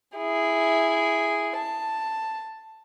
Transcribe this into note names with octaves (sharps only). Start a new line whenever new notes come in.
E4 G#4
A5